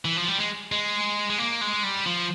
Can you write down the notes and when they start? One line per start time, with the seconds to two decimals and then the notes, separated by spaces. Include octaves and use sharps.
0.05 E3
0.17 F3
0.28 G3
0.38 G#3
0.72 G#3
1.30 G#3
1.38 A#3
1.61 G#3
1.83 G3
2.06 F3